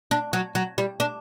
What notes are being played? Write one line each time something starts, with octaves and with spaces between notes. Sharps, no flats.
D4
F#3
F#3
G3
D4